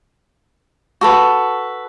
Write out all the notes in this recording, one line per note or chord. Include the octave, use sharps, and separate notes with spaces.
F#4 A4 B4